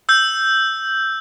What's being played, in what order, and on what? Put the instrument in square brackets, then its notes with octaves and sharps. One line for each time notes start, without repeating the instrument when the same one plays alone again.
[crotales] E6 G6